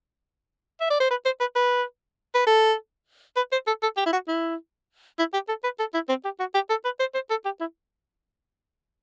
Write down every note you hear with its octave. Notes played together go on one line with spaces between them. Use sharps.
E5
D5
C5
B4
C5
B4
B4
B4
A4
B4
C5
A4
A4
G4
E4
F#4
E4
E4
G4
A4
B4
A4
E4
C4
G4
F#4
G4
A4
B4
C5
C5
A4
G4
E4